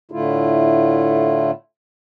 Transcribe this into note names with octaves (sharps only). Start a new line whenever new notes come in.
A2 D3 A3 E4 F4